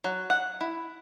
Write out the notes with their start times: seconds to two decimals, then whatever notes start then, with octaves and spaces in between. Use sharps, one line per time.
0.04 F#3
0.30 F#5
0.61 E4